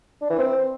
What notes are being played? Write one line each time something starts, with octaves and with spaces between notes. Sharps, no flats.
D4
E3
C4